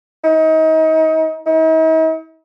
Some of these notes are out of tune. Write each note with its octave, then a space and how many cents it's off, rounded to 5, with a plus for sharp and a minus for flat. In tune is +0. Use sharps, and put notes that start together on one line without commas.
D#4 +35
D#4 +45